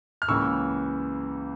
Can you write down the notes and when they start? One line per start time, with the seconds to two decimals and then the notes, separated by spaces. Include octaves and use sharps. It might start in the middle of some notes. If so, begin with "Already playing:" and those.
0.22 F6
0.28 C#2 C#3 E3 A#3 C#6 E6